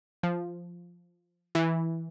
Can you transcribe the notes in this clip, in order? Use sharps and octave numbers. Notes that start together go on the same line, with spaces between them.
F3
E3